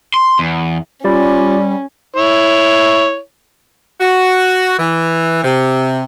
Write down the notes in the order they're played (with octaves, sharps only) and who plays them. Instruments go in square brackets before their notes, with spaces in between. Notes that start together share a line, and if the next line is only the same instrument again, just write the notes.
[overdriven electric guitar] C6
E2
[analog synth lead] G3 [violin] C#4 [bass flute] F4 [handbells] G4 D5 B5
[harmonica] E4 C#5
[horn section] F#4
E3
C3